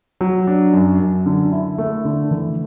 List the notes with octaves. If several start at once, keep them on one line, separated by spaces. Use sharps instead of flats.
F#3
D4
F#2
F#2
D3
E4
A3
D3
E3